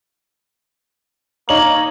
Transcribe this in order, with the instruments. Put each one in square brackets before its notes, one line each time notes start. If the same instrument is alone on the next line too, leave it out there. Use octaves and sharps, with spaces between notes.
[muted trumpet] A#3 [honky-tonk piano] D#4 C#5 F#7